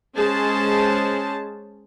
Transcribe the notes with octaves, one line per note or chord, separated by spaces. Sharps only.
G#3 C#4 G#4 C5 A5